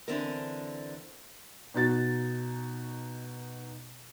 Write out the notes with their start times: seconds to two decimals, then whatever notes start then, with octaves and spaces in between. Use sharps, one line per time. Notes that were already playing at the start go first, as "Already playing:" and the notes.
0.08 D3 E3 C4 D4 A#4
1.74 B2 D#4 F#4 A6